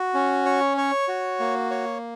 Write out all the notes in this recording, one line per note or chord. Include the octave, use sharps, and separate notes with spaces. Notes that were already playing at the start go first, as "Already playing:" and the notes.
Already playing: F#4
C#4
C#5
C#5
F#4
A#3
C#5